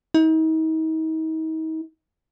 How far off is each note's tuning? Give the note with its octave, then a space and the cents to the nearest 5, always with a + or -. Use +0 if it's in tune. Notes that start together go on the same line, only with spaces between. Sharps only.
D#4 +40